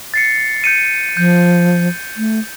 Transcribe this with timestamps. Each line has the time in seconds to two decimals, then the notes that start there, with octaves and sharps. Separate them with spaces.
0.14 A6 C7 C#7
0.64 G6 C#7 D#7
1.17 F3 G6
2.17 A3